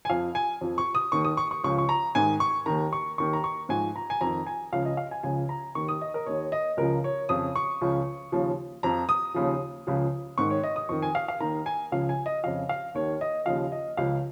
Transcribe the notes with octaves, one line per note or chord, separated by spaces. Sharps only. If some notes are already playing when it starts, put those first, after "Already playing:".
G#5
F2 F3 F5
G#5
F2 F3
C#6
D#6
D#2 D#3 C#6
D#6
C#6
C#6
C#2 C#3 F3 C#6
C#6
A#5
G#2 D#3 G#5
C#6
D#2 D#3 A#5
C#6
D#2 D#3 C#6
A#5
C#6
G#2 F3 G#5
A#5
G#5
F2 D#3 A#5
G#5
C#2 C#3 F3 F5
D#5
F5
G#5
C#2 C#3 F3 G#5
A#5
D#2 D#3 C#6
D#6
D#5
A#4
D#2 D#3 C#5
D#5
C#2 C#3 F3 A#4
C#5
F2 C#3 F3 D#6
C#6
C#2 C#3 F3
D#2 C#3 F3
F2 F3 A#5
D#6
D#2 C#3 F3
C#2 C#3 F3
G#2 D#3 C#6
C#5
D#5
D#6
F2 D#3 C#6
G#5
F5
F5
D#2 D#3 A#5
G#5
C#2 C#3 F3 F5
G#5
D#5
F2 C#3 F3 F5
F5
D#2 D#3 C#5
D#5
D#2 C#3 F3 F5
D#5
C#2 C#3 F3 F5